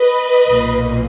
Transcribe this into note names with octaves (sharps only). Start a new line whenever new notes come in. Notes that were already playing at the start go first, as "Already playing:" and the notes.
Already playing: B4 D#5
B1 A#2